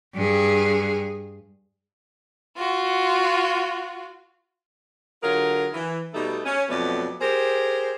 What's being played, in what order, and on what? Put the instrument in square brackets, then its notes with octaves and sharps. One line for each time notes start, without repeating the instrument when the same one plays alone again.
[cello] G2 G#4
[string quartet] F4 F#4
[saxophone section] D3 F#3 F4 G#4 A#4
E3
B2 G3 A3 D#4
C#4
F2 B2 F#3 A3 B3 D5
G4 G#4 A#4 C5